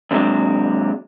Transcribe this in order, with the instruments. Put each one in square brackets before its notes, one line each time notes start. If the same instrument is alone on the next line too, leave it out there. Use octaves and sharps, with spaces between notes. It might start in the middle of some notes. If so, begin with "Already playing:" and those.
[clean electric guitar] D#2 C3 F#3 G#3 D4